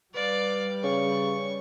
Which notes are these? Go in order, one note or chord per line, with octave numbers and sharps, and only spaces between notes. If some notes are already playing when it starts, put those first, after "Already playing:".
G3 B4 D5 F5 F#6
C#3 C#6